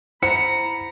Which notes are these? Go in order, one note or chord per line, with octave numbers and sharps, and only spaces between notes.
E4 C5 F#5 A#5 B5 C#7